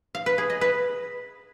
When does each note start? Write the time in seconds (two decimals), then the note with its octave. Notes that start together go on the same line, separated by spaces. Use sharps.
0.15 F5
0.26 B4
0.38 G#4
0.50 D#5
0.61 B4